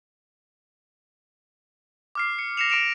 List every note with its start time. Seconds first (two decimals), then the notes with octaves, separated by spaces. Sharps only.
2.15 D6 F6 C7
2.39 C#7
2.57 A#6 C7 C#7 E7 F7
2.70 D6 A#6 D7 E7 F7